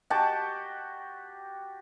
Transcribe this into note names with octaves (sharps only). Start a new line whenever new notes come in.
F#4 G4 A5